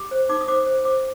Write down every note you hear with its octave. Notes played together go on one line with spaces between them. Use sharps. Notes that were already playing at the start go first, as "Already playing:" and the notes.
Already playing: G4 D6
C5
D#4 D6
D#6
C5 D6
C5
C5 D6